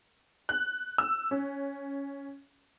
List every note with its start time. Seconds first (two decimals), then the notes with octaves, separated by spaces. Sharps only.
0.49 F#6
0.98 E6
1.31 C#4